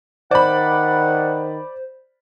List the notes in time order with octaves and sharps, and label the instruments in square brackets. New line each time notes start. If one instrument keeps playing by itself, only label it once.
[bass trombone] D#3 [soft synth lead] C5 [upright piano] D5 B5 [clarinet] F#5